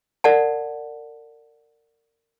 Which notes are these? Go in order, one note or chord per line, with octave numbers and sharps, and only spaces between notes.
A#4 D5 F#5 A5